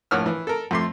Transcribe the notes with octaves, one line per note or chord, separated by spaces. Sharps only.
A#1 A2 C#5 F#5 E6 F6
E3
A4 A#4
F2 A3 C6